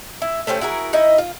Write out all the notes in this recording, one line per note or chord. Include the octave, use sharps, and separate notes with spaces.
E4
A3 C#4 G4 C5
E4 F#4 G#4 A#4
D#4 E4 D#5
F4